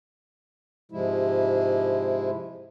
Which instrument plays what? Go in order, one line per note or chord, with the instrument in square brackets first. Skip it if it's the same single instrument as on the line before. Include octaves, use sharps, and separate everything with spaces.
[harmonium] G#2 C3 F3 G#3 E4